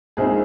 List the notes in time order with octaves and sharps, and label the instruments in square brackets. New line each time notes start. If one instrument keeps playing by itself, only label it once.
[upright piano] A#1 A#2 G#3 C4 D#4 G#4